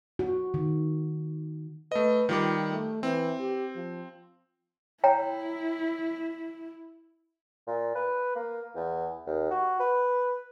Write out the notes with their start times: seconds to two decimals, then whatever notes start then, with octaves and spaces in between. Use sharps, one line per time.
0.19 F#4
0.54 D#3
1.92 A3 B4 D#5
2.29 D#3 G3 F4 D6
2.71 A3
3.03 E3 C4
3.40 G4
3.76 F3
5.04 E4 C#5 G5 A#5
7.67 A#2
7.95 B4
8.36 A#3
8.76 E2
9.27 D#2
9.51 F#4
9.80 B4